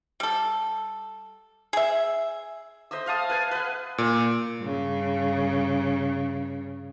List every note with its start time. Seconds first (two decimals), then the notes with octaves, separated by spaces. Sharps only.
0.20 G3 A4
1.73 G#4 E5
2.91 C5 D#5 E5 E6
3.06 E5 F5 A5 D#6
3.30 B4 G#5 A5
3.51 B4 F#5
3.98 A#2
4.60 G2 C#3